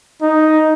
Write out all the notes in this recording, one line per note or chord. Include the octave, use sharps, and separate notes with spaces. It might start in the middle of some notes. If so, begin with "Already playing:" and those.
D#4